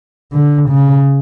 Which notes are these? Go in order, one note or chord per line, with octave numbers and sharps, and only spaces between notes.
D3
C#3